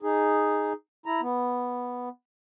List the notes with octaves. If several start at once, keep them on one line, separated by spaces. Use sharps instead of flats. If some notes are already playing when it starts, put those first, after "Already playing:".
D#4 G#4
E4 A#5
B3